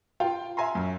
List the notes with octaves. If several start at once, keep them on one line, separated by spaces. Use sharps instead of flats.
F4 F5 G5
E5 F5 G#5 A#5 C6
F#2